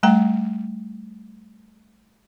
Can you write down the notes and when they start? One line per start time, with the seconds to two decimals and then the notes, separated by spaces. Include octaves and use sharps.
0.03 G3 A3 G5 A#5